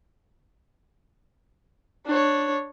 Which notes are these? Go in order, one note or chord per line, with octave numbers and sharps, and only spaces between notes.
D4 C#5